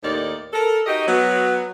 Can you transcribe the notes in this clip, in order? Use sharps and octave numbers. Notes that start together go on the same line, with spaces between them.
D#2 A2 D#3 D#4 C#5 D5
A4 A#4
D#4 F#4 G4 D#5
F#3 B3